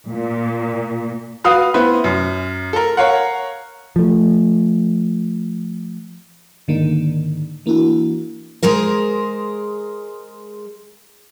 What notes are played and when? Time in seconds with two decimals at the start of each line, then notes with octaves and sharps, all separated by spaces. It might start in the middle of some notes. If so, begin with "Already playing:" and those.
0.11 A#2
1.44 F#4 B4 F5 D#6 F6
1.74 B3 C4 E4 B4
2.04 F#2
2.73 A4 A#4
2.97 A#4 C#5 F5 F#5
3.96 F3 A3
6.68 G#2 D3 D#3 A#3
7.66 E3 A#3 D4 E4 F#4
8.63 G#3 G#4 A#4 C5